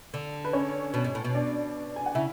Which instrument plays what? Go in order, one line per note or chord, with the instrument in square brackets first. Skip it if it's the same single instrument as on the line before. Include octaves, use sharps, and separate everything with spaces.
[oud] D3
[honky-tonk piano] B4
C#4 C#5
[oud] B2
G#2
A2
B2
[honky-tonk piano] D4 D5
G#5
F#5
[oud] C#3 [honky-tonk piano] E4 E5